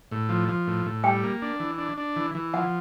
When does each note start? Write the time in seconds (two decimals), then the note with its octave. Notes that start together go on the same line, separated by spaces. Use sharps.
0.12 A2
0.29 F3
0.49 F3
0.67 A2
0.86 A2
1.04 G3 G5
1.24 A#3
1.42 D4
1.60 E3
1.78 D4
1.98 D4
2.16 E3
2.35 E3
2.54 F3 F#5